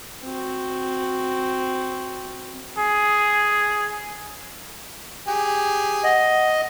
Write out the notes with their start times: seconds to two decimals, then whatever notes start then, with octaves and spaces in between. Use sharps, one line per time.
0.24 C4 F#4
2.78 G#4
5.28 G4 G#4
6.04 D#5 F#5